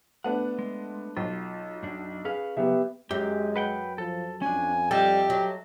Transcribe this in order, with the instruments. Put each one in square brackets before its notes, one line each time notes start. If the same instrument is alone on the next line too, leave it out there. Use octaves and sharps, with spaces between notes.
[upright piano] A3 B3 D4 [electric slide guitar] F#5
[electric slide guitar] G#3
[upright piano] B1 [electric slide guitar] F4
[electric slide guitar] F#2 D4
[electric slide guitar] C#4 B4 F5 [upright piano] G#4
[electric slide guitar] C#3 F#3 [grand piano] B3 G4 E5
[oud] F#2 [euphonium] G#3 [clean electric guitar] G4
[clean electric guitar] B4 F#5 G5
[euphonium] F3 [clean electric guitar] A4
[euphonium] F2 [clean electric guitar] C#4 D4 [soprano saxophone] G#5
[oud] G3 [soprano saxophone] G4 [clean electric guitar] A4 D#5 E5
[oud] F#3